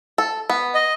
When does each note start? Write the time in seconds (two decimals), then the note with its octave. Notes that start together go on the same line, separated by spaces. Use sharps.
0.18 A4
0.50 B3
0.75 D#5